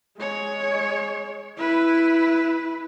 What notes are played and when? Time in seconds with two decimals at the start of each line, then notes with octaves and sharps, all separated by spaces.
0.18 G#3 C#5
1.57 E4 B4